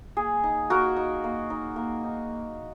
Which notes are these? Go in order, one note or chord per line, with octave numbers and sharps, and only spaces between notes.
A#3 G#4
D#4
A#3 F#4 A#4
D#4
A#3
D#4
A#3
D#4